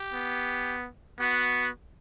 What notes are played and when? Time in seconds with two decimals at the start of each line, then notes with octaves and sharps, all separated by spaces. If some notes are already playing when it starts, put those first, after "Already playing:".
Already playing: G4
0.13 B3
1.20 B3 F#4